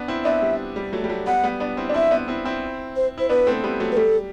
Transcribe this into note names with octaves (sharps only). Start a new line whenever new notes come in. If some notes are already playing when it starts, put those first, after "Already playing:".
Already playing: B3 D4
C4 E4
B3 D4 E5
G3
G3
F#3 A3
G3
F#3 A3
G3 B3 F#5
G3 B3
B3 D4
C4 E4
D4
C4 E4 E5
B3 D4
C4 E4
C4 E4
C5
E4 C5
B3 D4 B4
A3 C4
G3 B3
F#3 A3
B4
G3 A4